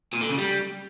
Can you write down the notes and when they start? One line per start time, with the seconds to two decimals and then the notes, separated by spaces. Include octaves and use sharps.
0.13 A#2
0.21 D3
0.29 C#3
0.38 G3